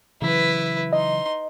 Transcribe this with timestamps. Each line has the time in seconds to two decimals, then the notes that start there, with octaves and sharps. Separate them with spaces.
0.22 C#3 E3 F#3 E4 B4
0.93 D#4 D#5 C6